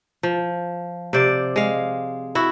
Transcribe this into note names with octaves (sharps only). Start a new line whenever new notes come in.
F3
C3 C5 D5
G#3 F5
E4 F#4